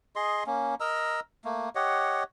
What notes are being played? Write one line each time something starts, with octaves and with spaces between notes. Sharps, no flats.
G#4 D#5 C6
A#3 C#4
A#4 D#5 A#5 E6
A3 A#3
G4 C#5 D#5 F#5